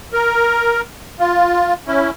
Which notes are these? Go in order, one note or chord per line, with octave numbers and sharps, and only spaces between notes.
A#4
F4
C#4 E4